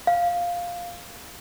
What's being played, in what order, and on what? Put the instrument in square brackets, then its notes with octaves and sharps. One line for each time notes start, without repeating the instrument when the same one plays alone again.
[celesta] F5